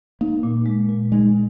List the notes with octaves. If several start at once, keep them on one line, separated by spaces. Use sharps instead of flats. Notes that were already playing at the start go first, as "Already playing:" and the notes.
A#3 D#4
A#2
G#3
A#2
G#3 D#4